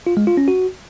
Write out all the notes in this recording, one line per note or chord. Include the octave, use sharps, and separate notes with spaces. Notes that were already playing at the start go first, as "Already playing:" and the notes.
F4
G#3
F4
C#4
F#4